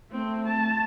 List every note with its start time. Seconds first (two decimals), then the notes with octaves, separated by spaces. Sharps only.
0.12 A3 C4
0.48 A5